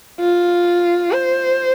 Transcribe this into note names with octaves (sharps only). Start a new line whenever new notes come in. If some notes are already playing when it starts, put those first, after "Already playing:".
F4
C5